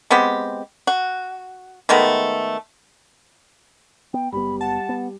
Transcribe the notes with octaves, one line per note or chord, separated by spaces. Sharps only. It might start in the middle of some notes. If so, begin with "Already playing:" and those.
G#3 B3 C4 G4
F#4
D#3 G#3 A3 B3
B3 G5
F#1 G3 B3 B5
F#5 A5
B3